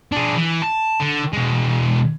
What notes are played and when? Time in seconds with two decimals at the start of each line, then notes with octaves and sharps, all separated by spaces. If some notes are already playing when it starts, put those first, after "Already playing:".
0.12 D4 G#4
0.36 E3
0.62 A5
1.01 D3
1.33 B2 G#3